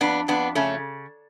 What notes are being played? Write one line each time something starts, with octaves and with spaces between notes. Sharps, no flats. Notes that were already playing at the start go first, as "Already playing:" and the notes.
F2 B3 D4
F2 B3 D4
C#3 A3 C#4